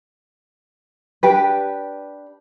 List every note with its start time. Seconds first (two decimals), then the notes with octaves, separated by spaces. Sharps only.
1.23 D4 G4 B4